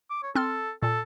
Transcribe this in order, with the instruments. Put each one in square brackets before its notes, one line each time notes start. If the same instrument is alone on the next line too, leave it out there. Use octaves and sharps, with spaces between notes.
[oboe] D6
C#5
[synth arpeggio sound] C4 C6 F6 [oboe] A4
[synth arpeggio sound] A#2 [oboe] A4